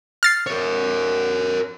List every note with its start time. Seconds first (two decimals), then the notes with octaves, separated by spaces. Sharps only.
0.23 F6 A6 C7
0.47 A#4 C#5